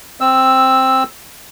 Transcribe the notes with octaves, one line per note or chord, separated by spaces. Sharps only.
C4 E6